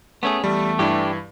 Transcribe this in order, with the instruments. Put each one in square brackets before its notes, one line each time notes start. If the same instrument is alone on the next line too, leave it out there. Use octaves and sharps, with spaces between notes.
[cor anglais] A3 [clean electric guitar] B3 C#4 G#4
[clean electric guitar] E2 [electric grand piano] G3 [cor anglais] A3
[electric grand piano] G2 E3 E4 [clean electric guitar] D4 G4